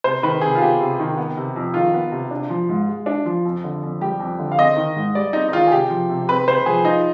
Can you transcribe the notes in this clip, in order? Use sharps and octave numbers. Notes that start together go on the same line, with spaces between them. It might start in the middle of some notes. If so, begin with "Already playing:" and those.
C3 C5
D#3 B4
C3 G#4
F4
B3 G4
C3
D#3
B3
C3
F2
D#3 F4
B3
C3
D4
F3
G#2
G#3
D4
F3
F2
D3
F2
G3 G4
F2
D3
F5
C4 D#5
D#3
G#2
G3 D5
C4 D#4
D#4
D#3 F4
G#4
C3 G4
F3
C3
C4 B4
C3 C5
F3 G#4
D#4 F4